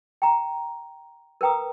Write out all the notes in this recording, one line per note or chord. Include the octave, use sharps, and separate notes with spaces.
G5 A#5
A#4 B4 G5 A#5 D#6